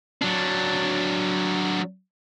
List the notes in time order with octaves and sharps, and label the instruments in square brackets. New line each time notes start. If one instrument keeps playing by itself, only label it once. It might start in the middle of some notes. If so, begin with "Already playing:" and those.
[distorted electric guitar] F#3 D4